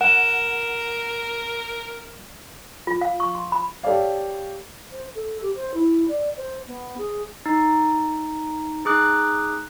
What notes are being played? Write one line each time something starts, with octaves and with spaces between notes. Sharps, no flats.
A#4 F#5 E7
F4
F5
C#6
C6
B5
G4 A4 C#5 D5 F5
C5
A4
G4
C5
E4
D5
C5
B3
G#4
D#4
D#4 G#4 D6 F#6